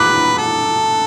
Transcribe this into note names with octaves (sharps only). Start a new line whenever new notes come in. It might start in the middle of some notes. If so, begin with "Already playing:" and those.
Already playing: B4 D6 F#6
A4